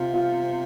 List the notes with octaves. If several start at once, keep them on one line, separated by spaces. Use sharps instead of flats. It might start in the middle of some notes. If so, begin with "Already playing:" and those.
Already playing: C3 F4
F4